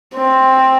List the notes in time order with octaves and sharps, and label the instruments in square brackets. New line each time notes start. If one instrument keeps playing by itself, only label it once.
[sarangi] C4